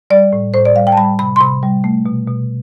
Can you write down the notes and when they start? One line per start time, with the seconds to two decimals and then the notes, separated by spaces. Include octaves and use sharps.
0.10 G3 D5
0.33 A2
0.54 A2 C5
0.65 D5
0.75 G3 F5
0.87 G5
0.92 A5
0.97 G3 B5
1.19 C3 B5
1.36 C6
1.40 C3 B5
1.63 G3
1.84 A3
2.06 B2
2.27 B2